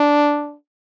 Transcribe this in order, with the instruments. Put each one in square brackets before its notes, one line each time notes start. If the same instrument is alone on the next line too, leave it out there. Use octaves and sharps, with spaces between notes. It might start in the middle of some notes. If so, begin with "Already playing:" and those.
Already playing: [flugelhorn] D4